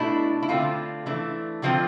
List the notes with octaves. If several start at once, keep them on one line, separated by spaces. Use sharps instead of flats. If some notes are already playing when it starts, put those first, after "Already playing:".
Already playing: B2 A3 D4 E4
E4
D3 A3 C4 F4
E3 A3 D4
D3 F3 C4 F4